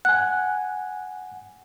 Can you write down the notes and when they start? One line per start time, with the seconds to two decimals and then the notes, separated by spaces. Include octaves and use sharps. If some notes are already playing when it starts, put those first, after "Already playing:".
0.05 F#5 G#5 F#6